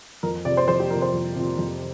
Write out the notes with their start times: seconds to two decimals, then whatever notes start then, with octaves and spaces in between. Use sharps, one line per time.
0.23 F2 A#4
0.45 C3 F3 D5
0.57 C5
0.68 F2 C5
0.80 G4
0.90 C3 F3 A#4
1.02 C5
1.13 F2
1.36 C3 F3
1.59 F2